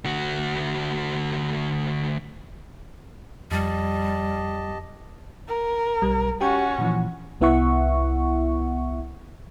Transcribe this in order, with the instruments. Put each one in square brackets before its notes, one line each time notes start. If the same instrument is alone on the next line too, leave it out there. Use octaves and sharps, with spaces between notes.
[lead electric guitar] D2 F#4
[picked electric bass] F2 [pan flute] G3 [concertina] G4 D#5 A5
[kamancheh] A#4
[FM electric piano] B1 G3
[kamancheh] C#4 F#4 [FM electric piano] G4 G5 C#6
[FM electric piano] A#2 E3 F3
C2 B3 E4 E5 F#5 C#6